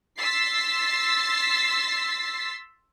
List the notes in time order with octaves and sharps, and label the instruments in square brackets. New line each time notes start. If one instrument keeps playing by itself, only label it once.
[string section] C6 E6 A6 B6 C7